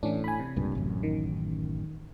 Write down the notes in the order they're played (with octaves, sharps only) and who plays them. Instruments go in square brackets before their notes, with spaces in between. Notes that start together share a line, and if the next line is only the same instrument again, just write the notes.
[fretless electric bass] A2 [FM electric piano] E3 C#4 D4
[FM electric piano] G#5 B5
C3
[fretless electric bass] C#2 G2 A#2
A1 F#2
[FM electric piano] D#3